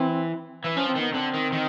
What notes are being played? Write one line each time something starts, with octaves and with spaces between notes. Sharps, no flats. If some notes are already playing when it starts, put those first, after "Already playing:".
Already playing: E3 C4
E3
F3 C#4
C4
D#3 B3
D3 C4
D#3
D#3